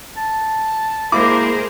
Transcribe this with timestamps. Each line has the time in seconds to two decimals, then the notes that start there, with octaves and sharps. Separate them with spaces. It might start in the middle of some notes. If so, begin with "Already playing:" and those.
0.17 A5
1.12 G#3 A#3 E4 G#4 A#4 C5 D6